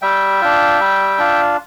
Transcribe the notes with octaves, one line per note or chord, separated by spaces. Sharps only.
G3 E5 G5
D4 F4
G3
D4 F4